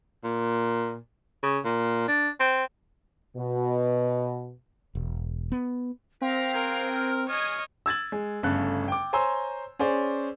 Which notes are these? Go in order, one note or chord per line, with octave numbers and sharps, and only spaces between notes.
A#2
C#3
A#2
D4
C4
B2
E1
B3
C4 G4 A#4 F5
F#4 G#4 A#4 G5
F6
G#4 C#5 D#5 G#5 F6
E6 G#6 A6 F#7
G#3
G1 C#3 A3 A4 F#6
G5 D6
C5 C#5 G#5 A#5 C6 E6
C#4 G#4 C5 D5